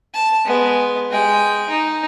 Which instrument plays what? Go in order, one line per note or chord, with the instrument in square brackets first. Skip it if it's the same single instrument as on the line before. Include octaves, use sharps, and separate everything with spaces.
[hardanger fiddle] A5
G#3 B3
G#3 G5
D#4